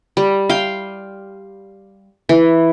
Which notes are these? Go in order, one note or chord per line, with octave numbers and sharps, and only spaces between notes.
G3
F5 G5 C6
E3